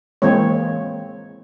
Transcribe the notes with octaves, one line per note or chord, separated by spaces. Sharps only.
E3 G#3 A#3 C4 C#5